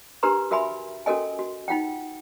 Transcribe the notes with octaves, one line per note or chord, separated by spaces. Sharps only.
D4 G4 A#4 B4 A#5 C6
F#4 A#4 E5 G#5 B5 C6
C#4 F#4 A4 A#4 D#5 G#5
F#4
D#4 F4 F#5 G5